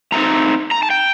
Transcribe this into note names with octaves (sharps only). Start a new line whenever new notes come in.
A2 A3 C4 D#4 A#5
A#5
A5
G5